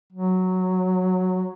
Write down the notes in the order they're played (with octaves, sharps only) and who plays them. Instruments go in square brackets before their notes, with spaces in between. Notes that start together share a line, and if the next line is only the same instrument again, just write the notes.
[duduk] F#3